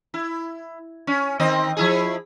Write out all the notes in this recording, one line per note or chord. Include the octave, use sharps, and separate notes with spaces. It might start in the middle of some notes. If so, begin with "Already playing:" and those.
E4
C#4
D#3 C4 D#5
F3 E4 G#4